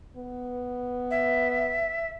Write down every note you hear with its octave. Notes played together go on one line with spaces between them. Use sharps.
B3
E5